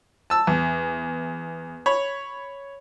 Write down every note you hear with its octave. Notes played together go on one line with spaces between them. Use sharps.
A5 E6
E2
C#5 B5